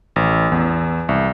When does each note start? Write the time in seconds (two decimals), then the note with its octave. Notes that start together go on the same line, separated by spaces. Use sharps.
0.16 A1
0.52 E2
1.09 C2